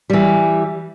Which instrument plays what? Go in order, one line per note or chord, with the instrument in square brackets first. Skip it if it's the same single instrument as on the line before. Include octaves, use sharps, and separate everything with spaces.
[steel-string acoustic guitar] E3 G3